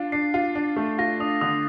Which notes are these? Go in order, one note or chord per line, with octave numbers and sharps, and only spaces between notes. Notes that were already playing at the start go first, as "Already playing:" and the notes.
Already playing: D4 F4
D4 C7
F4
D4
A3
F4 A#6
D4 D#6
D3 D#6